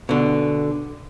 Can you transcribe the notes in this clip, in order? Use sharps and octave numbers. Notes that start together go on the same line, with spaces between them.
B2 D3